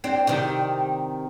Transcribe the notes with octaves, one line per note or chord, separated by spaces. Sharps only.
C4 D4
C3 D#3